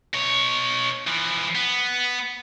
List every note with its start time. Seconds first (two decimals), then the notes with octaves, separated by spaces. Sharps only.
0.14 B2 C#5
1.07 E3 F3
1.55 B3